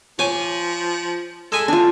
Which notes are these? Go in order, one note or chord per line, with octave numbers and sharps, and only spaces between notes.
F3 C#5 G#5 D6
G#3 A4 G#5 B5
D3 D4 F4